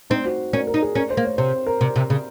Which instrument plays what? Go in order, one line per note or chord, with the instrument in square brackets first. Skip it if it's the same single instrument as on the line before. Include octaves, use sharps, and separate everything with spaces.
[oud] C4 [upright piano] D#4
[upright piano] F#4
[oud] C#4 [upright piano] A#4
[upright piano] A#4
[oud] D#4
[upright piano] G#4
[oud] C#4 [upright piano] A#4
[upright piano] C5
[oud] A#3
[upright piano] C#5
[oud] C3 [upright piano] C5
[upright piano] A#4
[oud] C3
C3
C#3